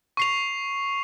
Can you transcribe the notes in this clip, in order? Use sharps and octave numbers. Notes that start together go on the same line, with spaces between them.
C#6 C7 F7